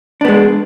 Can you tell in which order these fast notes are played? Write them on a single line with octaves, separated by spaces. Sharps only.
D4 B3 G#3